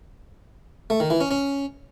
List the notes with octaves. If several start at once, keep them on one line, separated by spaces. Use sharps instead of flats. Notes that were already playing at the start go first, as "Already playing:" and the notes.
A3
D#3
E3
C#4
C#4